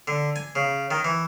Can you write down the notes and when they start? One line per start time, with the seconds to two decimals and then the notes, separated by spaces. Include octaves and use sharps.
0.07 D3
0.36 G#5
0.55 C#3
0.91 D#3
1.04 E3